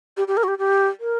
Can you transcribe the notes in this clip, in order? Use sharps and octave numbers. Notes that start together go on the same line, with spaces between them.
G4
G4
A#4
F#4
G4
G4
A#4